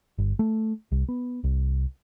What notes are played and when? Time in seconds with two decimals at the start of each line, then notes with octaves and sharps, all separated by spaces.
0.18 G1
0.39 A3
0.92 C2
1.09 B3
1.44 C2